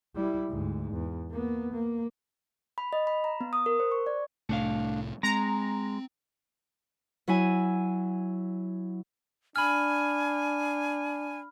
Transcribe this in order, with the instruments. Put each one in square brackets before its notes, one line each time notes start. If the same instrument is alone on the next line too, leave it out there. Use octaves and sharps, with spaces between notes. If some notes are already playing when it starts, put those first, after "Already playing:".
[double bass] G3 E4
D2 G#2
E2
A#3 B3
A#3
[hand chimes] B5
D#5
B5
A#5
B3
D#6
A#4
C5
C#6
D5
[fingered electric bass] C2 A2 [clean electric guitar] A3 D4 F5
[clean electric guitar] G#3 [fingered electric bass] C4 [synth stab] A#5
[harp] F#3 E4 G#5
[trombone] D4 [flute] G#5 [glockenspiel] B5 F6